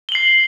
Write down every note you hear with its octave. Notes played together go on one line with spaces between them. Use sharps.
C7 F#7 G7